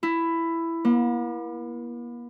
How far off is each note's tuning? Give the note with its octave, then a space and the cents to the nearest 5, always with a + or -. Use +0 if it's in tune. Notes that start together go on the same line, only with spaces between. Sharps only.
E4 +10
A#3 +45